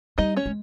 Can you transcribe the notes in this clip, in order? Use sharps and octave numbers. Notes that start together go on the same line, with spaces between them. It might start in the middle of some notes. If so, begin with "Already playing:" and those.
G3 D#4 D#5
C#4 C#5
G#3